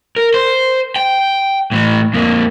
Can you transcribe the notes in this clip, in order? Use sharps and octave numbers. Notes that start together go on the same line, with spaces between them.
A#4
C5
G5
A2 E3
F2 A#3